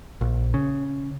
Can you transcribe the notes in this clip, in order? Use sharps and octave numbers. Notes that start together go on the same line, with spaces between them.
A#1
C#3